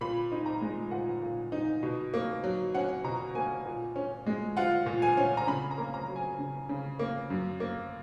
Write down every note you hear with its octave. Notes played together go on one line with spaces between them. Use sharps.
A#2 B5
D#4
A#5
G#3
A#2 F#5
A#2
D#4
B2
A#3
F#3
C#4 F#5
B2 A#5
A#3 G#5
A#2
C#4
G#3
F4 F#5
A#2
G#5
C#4
A#5
C#3 B5
A#5
A#3
A#5
F#3
G#5
C#3
C#3
A#3
F#2
A#3